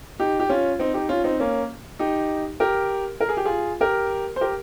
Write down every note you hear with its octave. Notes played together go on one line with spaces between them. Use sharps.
D#4 G4
G4
C#4 F4
C4 D#4
D#4 G4
C#4 F4
C4 D#4
A#3 C#4
D#4 G4
G4 A#4
A#4
G#4
G4
F4 G#4
G4 A#4
C5
G4 A#4